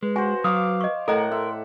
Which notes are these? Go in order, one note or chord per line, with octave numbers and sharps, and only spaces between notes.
G#3 B4
F#4 C5 G#5
F#3 F5 D6 D#6
D#5 C#6
A2 A3 A4 A#4 D#5 F#5 A#5
E5 C6